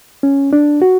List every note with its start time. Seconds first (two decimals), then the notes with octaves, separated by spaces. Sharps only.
0.23 C#4
0.53 D4
0.82 F#4